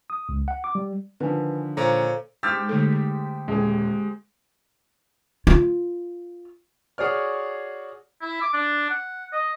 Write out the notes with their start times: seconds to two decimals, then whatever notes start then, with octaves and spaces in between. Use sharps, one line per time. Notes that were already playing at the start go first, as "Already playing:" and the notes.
0.10 D#6
0.29 C#2
0.48 F#5
0.64 D6
0.75 G3
1.20 D3 D#3 F3 B4 G#5
1.77 A#2 A4 C5 C#5 F5 A#5
2.43 G#2 G4 E6 F6 A6
2.69 D3 A3 A4
3.48 D#1 G#3 G#4
5.47 F4
6.98 F#4 G#4 C#5 D5 F6
8.21 E4
8.41 D6
8.54 D4
8.90 F#5
9.32 D#5